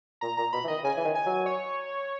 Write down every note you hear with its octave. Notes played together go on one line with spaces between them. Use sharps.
A#2 A#5
A#2 A#5
B2 B5
E3
D#3 D#5
C#3 G#5
E3
D#3
G#5
F#3
C#5